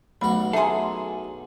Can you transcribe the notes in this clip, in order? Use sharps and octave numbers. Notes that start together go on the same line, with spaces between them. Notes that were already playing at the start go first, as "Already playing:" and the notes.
B1 F#3 A3 F#4 B5
G#4 A4 E5 A#5 C6